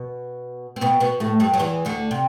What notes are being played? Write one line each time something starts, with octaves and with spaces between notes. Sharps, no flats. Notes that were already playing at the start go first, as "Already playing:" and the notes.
Already playing: B2
C4
B2 B3
B2 B3
A2 A3
G2 G3
F#3
E2 E3
D2 D3
C3